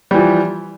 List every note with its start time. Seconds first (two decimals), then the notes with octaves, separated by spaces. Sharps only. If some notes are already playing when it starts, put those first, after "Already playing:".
0.11 G3
0.14 E3
0.18 F3